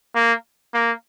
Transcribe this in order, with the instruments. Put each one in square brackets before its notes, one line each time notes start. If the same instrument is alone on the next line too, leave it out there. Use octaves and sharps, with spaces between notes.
[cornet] A#3
A#3